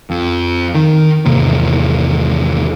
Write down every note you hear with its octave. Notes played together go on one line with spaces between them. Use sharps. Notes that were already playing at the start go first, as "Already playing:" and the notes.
F2
D#3
G#1 E2 C3 A#3